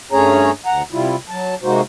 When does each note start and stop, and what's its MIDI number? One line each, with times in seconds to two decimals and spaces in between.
0.12 0.51 43
0.12 0.51 57
0.12 0.51 61
0.12 0.51 68
0.12 0.51 73
0.12 0.51 82
0.66 0.82 38
0.66 0.82 78
0.66 0.82 82
0.92 1.16 48
0.92 1.16 55
0.92 1.16 64
0.92 1.16 65
1.29 1.55 54
1.29 1.55 81
1.63 1.81 48
1.63 1.81 56
1.63 1.81 58
1.63 1.81 63
1.63 1.81 66
1.63 1.81 72